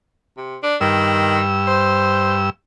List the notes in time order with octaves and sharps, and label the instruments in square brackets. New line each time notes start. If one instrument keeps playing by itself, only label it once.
[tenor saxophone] C3
D4
[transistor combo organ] G2 E6 [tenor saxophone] D#3
[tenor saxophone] C5